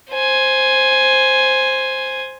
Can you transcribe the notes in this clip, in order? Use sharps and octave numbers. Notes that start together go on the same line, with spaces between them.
C5 G#5